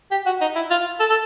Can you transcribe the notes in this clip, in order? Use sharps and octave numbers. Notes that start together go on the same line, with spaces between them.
G4
F#4
D#4
E4
F4
A4
A4